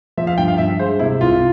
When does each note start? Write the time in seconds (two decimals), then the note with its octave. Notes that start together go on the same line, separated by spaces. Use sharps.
0.18 F3 E5
0.27 F5
0.38 G2 G5
0.48 F5
0.58 G2 E5
0.79 G#3 C5
0.99 C3 E4
1.21 C2 F4